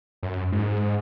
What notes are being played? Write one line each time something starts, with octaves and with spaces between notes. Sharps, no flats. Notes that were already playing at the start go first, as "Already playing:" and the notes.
F#2
G#2